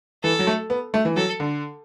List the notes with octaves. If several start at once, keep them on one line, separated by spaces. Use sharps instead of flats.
E3 A4
F#3
A3
B3
A3
E3
F#3 A4
D3